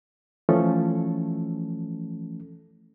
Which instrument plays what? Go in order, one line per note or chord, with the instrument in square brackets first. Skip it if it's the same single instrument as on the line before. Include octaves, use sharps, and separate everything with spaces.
[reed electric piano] E3 F3 A3 C#4 A4